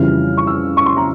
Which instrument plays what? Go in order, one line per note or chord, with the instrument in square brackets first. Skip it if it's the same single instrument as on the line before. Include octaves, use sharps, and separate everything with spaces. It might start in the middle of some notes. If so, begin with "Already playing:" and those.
Already playing: [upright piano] F2 C#3 E3 G3 F6
C#6
E6
C#6
C6
A#5